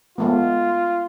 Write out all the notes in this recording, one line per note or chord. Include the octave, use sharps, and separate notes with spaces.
G#3 A3 B3 F4